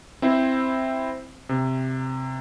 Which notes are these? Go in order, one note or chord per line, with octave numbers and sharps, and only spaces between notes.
C4 E4 C5
C3